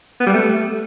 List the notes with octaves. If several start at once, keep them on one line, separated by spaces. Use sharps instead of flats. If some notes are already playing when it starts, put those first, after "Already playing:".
B3
G3
A3